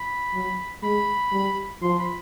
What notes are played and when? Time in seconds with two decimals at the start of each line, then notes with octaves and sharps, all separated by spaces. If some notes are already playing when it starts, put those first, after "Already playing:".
Already playing: B5
0.34 F#3
0.83 G#3 B5
1.32 G3
1.82 F3 C6
1.99 B5